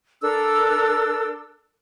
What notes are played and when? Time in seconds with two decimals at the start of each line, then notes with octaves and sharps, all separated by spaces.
0.22 D4 A4 A#4 E6